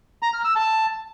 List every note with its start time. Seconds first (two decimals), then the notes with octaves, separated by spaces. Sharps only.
0.22 A#5
0.34 F6
0.45 E6
0.56 A5